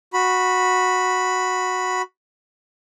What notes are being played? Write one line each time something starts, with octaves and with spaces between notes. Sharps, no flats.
F#4 B5